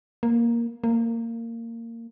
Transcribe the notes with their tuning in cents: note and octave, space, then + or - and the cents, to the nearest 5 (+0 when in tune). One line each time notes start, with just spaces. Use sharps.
A#3 +5
A#3 -20